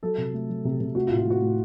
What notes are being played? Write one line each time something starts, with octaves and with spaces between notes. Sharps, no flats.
F#3 A4
C3
A3
F#3
C3
C3
A3 F#4
F4
A2
F4
A3 F#4
A2